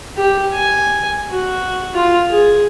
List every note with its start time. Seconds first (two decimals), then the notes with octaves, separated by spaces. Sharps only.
0.17 G4
0.53 G#5
1.31 F#4
1.94 F4
2.30 G#4